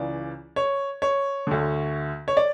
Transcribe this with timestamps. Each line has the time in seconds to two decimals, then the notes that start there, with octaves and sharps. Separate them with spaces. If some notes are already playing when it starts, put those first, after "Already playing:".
Already playing: C#2 C#3 E3 D5
0.56 C#5
1.02 C#5
1.47 D2 D3
2.28 C#5
2.37 D5